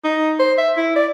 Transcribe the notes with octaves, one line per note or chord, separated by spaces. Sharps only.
D#4
C5
E5
E4
D5